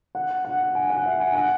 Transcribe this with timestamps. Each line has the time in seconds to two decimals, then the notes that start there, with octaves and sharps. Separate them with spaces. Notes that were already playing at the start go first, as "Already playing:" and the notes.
0.15 F#5
0.45 F#5
0.75 G#5
0.90 F#5
1.06 E5
1.20 G#5
1.35 F#5